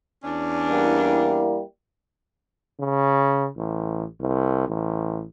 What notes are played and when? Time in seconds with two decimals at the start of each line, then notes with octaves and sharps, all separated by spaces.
0.24 E2 C#4 D4
0.69 G3 A#3 E4
2.80 C#3
3.57 A1
4.21 C2
4.68 A1